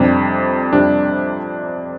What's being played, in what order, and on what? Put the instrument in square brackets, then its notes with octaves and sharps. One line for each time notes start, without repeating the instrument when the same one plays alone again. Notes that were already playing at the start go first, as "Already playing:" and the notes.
Already playing: [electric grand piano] F2 C3 G3 D4
F2 C3 G3 D4